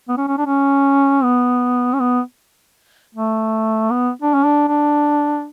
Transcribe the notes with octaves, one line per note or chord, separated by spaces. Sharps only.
B3
C#4
C#4
D4
C#4
B3
C#4
B3
A3
B3
D4
C#4
D4
D4